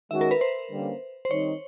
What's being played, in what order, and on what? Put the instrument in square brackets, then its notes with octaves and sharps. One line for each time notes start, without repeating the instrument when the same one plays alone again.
[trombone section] D#3 G#3 C#4 F#4 [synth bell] E5
[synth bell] A#4
B4
C5
[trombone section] D3 G3 A#3 C#4
[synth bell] C5
[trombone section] D#3 G3 C4 D#4 [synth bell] C#5